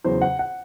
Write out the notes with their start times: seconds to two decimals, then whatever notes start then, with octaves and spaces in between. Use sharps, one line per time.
0.04 E2 C#3 F#3 C5
0.22 F#5
0.39 F#5